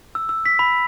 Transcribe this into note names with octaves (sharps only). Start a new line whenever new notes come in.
E6
E6
B6
B5